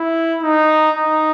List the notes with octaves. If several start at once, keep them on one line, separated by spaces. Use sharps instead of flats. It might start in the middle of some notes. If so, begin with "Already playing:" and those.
Already playing: E4
D#4
D#4